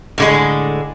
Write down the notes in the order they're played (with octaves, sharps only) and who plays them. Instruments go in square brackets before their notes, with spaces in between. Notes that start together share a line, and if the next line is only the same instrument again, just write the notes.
[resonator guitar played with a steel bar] A2 D3 G#3